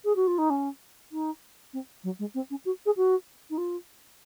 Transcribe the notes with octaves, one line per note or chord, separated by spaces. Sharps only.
G#4
F#4
F4
D#4
C#4
D#4
C4
F#3
G#3
C4
C#4
F#4
G#4
F#4
D#4
F4